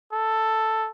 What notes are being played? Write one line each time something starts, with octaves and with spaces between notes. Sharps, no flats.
A4